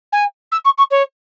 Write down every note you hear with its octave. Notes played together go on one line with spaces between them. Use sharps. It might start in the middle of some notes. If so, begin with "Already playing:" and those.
G#5
E6
C#6
C#6
C#5